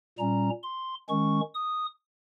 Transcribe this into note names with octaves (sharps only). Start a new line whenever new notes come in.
A#2 G3 C#4 A#5
C6
D#3 G#3 C#4 C#6
D#6